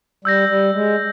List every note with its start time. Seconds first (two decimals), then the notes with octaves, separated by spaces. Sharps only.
0.25 G3 E6 G6 A#6
0.49 G3
0.74 G#3